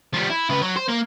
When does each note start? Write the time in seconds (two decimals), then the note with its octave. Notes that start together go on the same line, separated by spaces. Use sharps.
0.14 F3 G3
0.30 E4
0.50 C#3 B4
0.62 F#3
0.76 C5
0.88 A#3